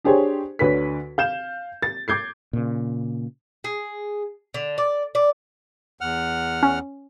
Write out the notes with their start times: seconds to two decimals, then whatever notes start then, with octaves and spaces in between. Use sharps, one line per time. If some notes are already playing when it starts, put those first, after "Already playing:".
0.04 D4 G4 G#4 C5 C#5
0.59 D2 D3 B4 C#5 B6
1.18 F5 G6 E7
1.82 A6
2.08 D6 G6 G#6 C7
2.53 A#2 C#3
3.64 G#4
4.54 D3
4.78 D5
5.15 D5
6.01 E2 F#5 F6
6.63 C#4